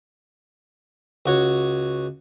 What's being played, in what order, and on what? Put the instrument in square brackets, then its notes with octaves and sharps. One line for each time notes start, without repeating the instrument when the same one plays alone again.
[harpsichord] C#2 F#4 C#5